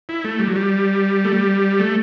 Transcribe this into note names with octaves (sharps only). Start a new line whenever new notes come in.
E4
A3
G3
F#3
G3
A3
G3
A3